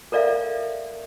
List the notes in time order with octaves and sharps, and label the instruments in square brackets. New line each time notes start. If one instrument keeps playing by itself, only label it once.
[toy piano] A4 A#4 D5 E5 F5